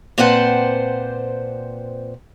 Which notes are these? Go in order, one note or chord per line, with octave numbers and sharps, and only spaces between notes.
A#2 C4 B4 C5 F#5 A5